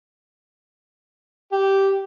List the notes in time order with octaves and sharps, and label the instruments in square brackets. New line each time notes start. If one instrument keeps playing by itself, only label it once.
[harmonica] G4